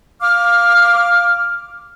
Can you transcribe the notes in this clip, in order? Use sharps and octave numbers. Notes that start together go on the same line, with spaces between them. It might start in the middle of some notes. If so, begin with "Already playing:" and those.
F5 D6 F6